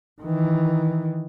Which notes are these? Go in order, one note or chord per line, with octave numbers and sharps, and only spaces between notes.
D#3 E3